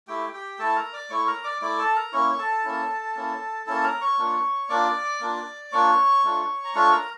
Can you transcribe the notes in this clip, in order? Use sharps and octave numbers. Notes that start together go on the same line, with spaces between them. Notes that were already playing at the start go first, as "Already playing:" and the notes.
A3 E4 G4 G5
G4 G5
A3 E4 A4 A5
A#4 A#5
D5 D6
A3 E4 C#5 C#6
A#4 A#5
D5 D6
A3 E4 D5 D6
A4 A5
A#4 A#5
A#3 C#4 E4 C#5 C#6
A4 A5
A#3 C#4 E4
A#3 C#4 E4
A#3 C#4 E4 A4 A5
A#4 A#5
C#5 C#6
A#3 D4 F4
A#3 D4 F4 D5 D6
A#3 D4 F4
A#3 D4 F4 C#5 C#6
A3 D4 F4
A#5
A3 D4 F4 C#5 C#6
A#4 A#5